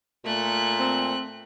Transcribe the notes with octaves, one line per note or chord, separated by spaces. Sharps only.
A#2 A3 F#6
C4